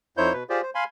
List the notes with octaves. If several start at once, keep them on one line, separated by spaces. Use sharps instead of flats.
F2 D#4 E4 C5 C#5 G6
B2 B4
F4 G4 G#4 C5 D5
C5
F5 G#5 B5 C6